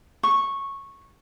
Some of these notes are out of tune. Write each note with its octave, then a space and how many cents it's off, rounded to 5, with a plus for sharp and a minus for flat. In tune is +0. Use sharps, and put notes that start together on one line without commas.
C#6 -10